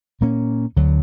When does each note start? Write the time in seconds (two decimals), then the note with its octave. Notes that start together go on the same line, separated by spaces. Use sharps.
0.21 A#2 A#3 C#4
0.76 D2 D3 F#3